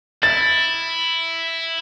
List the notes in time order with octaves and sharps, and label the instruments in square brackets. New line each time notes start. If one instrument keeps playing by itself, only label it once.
[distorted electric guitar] E4 [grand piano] A6